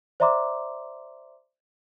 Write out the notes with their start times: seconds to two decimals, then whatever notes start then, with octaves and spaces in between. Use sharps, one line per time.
0.20 C5 D5 E5 A#5 C6 D6